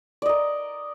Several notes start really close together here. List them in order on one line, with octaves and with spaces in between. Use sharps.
D5 D#5 A#4